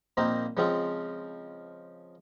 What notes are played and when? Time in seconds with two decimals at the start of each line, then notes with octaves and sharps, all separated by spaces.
0.17 A#1 A#3 C4 D#4 C5
0.57 C#3 F3 G#3 C4 F4